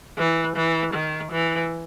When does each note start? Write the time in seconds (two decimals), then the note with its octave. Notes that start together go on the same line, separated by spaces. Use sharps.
0.18 E3
0.56 E3
0.94 D#3
1.32 E3